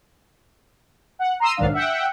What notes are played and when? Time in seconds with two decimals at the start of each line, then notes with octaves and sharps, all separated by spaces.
1.19 F#5
1.40 A#5 C6 D#6 E6
1.57 B1 G#2 D#3 F#3 D4 F5
1.73 E5 F#5 G5